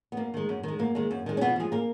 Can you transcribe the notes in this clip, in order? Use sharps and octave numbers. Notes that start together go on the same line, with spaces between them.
B3
F#2 A#3
D#3 G#3
F#2
D#3 G#3
F#2 A#3
D#3 G#3
F#2
D#3 G#3
C#4
F2 B2 B3
F3 G#3 G#4
A#3 A#4